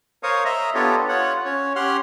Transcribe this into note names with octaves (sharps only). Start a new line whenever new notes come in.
A#4 C5 C#5 F5 C#6 D#6
D#5 E5 A#5
B3 D4 F4 G4 A4 C#5
F4 C#5 F#5
C#4 C#5
C#4 G4 F#5 C6 F6